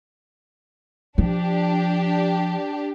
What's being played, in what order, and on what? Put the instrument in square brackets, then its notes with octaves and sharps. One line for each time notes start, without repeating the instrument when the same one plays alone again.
[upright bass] F3 [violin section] D4 G4